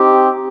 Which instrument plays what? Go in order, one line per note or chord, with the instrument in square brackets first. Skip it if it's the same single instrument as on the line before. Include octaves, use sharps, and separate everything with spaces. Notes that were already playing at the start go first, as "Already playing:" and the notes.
Already playing: [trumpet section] C4 D#4 G4